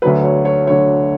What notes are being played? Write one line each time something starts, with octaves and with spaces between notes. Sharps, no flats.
D2 D3 F#3 B4
C#5
C#5
D2 D3 F#3 C#5